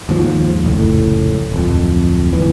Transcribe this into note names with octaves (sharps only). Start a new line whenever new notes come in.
D#2 G#2 F3
F1 C#2 A2
D1 F2
G1 D#2 E3